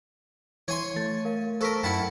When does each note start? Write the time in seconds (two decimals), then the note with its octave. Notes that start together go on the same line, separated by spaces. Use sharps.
0.68 E3 C#5 G#5 C6
0.96 A3 A6
1.25 A#4 F5
1.61 A4 A#4 C5 C#6 B6
1.83 F#2 E4 F#5 G5 A5 B5 B6